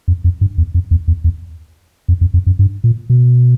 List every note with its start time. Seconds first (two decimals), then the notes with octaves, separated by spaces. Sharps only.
0.08 F2
0.24 F2
0.41 G2
0.58 E2
0.74 F2
0.91 E2
1.08 E2
1.24 E2
2.08 F2
2.21 F2
2.34 F2
2.47 F#2
2.59 G2
2.84 A#2
3.10 B2